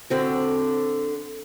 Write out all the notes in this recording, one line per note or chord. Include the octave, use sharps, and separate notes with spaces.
D3 C4 F#4